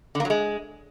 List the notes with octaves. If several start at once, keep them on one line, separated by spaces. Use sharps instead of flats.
D3
A#3
F#3
G#3